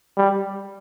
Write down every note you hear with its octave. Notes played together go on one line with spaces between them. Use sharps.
G3